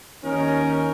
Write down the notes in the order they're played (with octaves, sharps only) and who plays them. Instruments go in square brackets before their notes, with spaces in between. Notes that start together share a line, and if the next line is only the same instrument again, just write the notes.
[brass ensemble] D#2 C#4 D#4 A#4